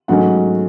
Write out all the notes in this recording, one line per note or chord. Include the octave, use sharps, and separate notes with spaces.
G#2 F#3 A3 C#4 F#4 F#5